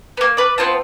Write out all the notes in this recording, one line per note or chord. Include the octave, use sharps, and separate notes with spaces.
A#3 B3
B4 D5
B3 C4 F4 A5